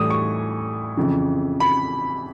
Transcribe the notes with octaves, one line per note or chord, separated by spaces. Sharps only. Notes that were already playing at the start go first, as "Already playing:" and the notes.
Already playing: A2 E3 G3 D#6
C#6
F2 C#3 E3
B5